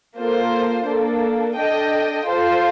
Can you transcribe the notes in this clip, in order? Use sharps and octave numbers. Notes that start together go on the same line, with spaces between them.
A#3 F4 A4 C5
A#3 D4 A4
D4 A4 D#5 G5
F4 A4 C5